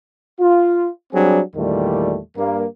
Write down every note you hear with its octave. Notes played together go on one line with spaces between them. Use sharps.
F4
F#3 G3 C4 D4 G#4
E2 A#2 D#3 G3 A3
G2 A#3